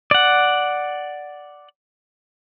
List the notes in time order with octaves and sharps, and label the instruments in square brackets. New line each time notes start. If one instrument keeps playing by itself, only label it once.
[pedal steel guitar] D5 F#5